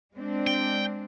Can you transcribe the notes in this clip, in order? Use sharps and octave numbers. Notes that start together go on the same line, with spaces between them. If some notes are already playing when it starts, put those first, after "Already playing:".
G#3 C4 D4
G5